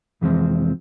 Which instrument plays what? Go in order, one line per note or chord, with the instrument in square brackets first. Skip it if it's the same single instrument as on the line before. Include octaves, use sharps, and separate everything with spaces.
[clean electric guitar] C2 F2 E3 F3 G#3 C4